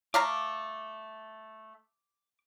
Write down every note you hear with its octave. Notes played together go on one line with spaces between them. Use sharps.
A3 F5 A#5 D6